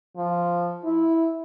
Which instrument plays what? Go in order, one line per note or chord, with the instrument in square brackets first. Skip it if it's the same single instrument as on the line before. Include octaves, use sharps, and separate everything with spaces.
[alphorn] F3
E4